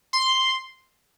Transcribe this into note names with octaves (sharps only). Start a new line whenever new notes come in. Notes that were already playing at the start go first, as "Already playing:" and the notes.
C6